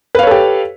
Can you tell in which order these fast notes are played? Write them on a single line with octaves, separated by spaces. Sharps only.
B4 F5 C#5 A4 G4